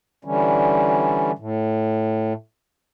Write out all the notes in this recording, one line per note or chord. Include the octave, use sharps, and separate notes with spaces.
D3 E3 G3 C#4
A2